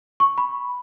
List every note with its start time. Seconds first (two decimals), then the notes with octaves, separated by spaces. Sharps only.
0.20 C#6
0.38 B5